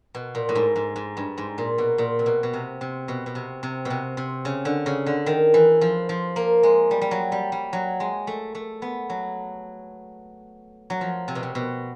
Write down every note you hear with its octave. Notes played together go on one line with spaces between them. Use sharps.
B2
A#2
A2
G#2
G#2
G#2
G2
G#2
A#2
B2
A#2
C3
B2
B2
C3
C3
B2
B2
C3
C3
B2
C3
C3
C#3
D3
C#3
D3
D#3
E3
F3
F3
A#3
G#3
G3
G3
F#3
G3
G3
F#3
G#3
A3
A3
B3
F#3
F#3
F3
C3
B2
C3
B2